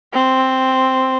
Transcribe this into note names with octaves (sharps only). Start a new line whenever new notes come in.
C4